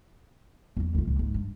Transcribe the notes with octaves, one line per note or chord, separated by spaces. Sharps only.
E2 F#3
D2 F4
C#2 A#2
G#2
G2